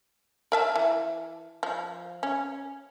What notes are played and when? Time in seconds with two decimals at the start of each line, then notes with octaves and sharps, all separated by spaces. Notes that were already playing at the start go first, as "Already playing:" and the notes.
0.52 A#4 E5 A5
0.76 E3
1.63 F3
2.23 C#4